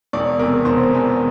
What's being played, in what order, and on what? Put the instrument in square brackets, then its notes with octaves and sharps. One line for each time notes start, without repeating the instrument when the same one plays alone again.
[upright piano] E1 D5
E2 C3 A#4
E1 C5
E2 C3